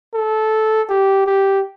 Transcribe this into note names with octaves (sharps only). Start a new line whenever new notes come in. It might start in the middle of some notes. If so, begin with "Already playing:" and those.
A4
G4
G4